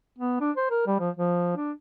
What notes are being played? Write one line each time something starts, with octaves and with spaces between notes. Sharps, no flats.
B3
D4
C5
A#4
G3
F3
F3
D4